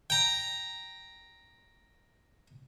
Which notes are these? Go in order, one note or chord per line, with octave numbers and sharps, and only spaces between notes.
G5 A#5